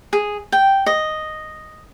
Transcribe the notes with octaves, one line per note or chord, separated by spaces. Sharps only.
G#4
G5
D#5